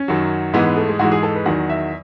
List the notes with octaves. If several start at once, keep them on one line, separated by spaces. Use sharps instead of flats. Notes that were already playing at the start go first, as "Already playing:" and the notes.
Already playing: C#4
F#2 D#3 F#3
G#2 E3 G#3 B3
B3
A3
G#3
G#2 E3 G#3 F#4
G#4
A4
B4
E2 D#3 F#3 F#5
E5